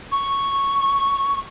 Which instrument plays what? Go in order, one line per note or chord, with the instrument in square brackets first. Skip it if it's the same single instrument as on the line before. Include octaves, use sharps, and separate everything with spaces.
[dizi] C#6